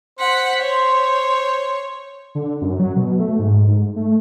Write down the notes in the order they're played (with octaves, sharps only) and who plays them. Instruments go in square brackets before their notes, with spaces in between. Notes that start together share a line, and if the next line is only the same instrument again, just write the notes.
[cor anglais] C5 [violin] F#5 B6
[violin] C#5
[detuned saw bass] D3
F#2
F#3
B2
A3
G#2
G#2
A3